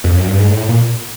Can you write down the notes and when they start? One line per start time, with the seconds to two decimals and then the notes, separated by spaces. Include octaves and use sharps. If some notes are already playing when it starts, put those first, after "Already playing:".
0.04 F2
0.16 F#2
0.27 G2
0.39 G#2
0.50 A2
0.69 A#2